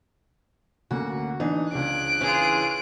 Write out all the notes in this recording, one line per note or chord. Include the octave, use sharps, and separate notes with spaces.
D2 A#3 C#4 F#4
E3 D4 D#4
C#2 D4 G#4 F#6 D7
E3 C#4 F4 G#4